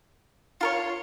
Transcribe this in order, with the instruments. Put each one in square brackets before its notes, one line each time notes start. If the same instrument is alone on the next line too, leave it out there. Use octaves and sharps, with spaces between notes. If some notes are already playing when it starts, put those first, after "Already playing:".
[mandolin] F4 A#4 C#5